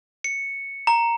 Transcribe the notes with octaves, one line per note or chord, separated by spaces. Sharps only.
C#7
A#5